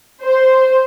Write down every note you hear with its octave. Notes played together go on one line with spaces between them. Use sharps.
C5